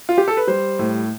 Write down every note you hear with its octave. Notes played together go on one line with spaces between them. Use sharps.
F4
G4
A4
B4
G3 C5
A2